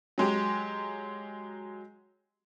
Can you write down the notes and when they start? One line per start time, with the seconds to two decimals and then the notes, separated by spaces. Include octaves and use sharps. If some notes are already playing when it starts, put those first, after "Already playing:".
0.18 F#3 G#3 G4